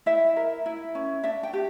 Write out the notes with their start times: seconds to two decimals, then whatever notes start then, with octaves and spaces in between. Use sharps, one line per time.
0.06 E4 E5
0.36 A#4
0.66 E4
0.95 C#4
1.24 D4 E5
1.43 G5
1.53 G4